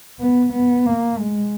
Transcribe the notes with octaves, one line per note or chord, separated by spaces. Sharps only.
B3
B3
A#3
G#3